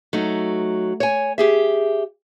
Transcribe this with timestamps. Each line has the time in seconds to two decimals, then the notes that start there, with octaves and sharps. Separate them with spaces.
0.13 F#3 A3 D#4
1.00 C#5 G#5
1.38 G4 G#4 E5